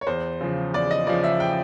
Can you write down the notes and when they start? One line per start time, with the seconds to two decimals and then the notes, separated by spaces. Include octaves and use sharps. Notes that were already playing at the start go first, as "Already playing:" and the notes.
0.01 C#5
0.07 E2 C5
0.41 C#3 F3
0.73 E2 D5
0.91 D#5
1.07 C#3 F3 D5
1.24 E5
1.40 G5